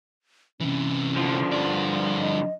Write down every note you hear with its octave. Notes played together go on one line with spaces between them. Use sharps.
C3 E3 C#4
D3 F3
G2 D5
D#5